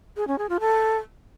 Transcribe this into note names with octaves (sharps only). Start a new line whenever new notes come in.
G#4
C#4
G#4
F4
A4